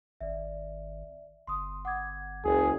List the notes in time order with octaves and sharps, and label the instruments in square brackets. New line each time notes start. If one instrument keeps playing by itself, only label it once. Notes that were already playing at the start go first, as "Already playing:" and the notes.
[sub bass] G#1 [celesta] D5 E5
[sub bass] G1 [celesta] C6 D#6
[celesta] F#5 D6 G#6
[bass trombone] F#1 [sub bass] C#2 [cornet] G#4